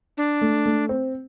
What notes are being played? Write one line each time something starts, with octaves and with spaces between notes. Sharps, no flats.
D4
A3
A3
C4